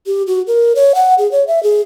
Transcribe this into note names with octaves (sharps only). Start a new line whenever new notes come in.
G4
F#4
A#4
C#5
F#5
G#4
C#5
E5
G#4